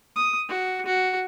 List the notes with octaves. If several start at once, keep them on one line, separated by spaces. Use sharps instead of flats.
D#6
F#4
F#4